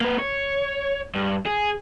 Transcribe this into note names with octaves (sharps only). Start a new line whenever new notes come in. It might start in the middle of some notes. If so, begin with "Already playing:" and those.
A#3 B4
C#5
G2
G#4